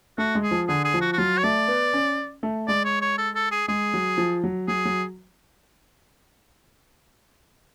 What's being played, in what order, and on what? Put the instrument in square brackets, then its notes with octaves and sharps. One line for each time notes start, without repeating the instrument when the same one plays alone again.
[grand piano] A3 [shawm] F#4
[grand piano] G#3
[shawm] G#4
[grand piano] F3
[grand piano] D3 [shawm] G#4
[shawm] G#4
[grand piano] F3
[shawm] F#4
F#4
[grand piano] F#3 [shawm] F4
[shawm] C#5
[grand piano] A3 [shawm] D5
[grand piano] B3
C#4
A3
[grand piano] G#3 [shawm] D5
[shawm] C#5
C#5
A4
A4
G#4
[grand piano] G#3 [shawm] G#4
[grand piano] F#3
F3
F#3
[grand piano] F#3 [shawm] G#4
[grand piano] F#3